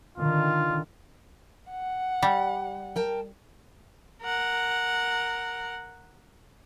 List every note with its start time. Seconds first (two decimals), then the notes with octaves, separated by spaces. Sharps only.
0.18 D3 D#3 F4
1.70 F#5
2.22 G3
2.96 A#4 G5 A5
4.23 A#4 F#5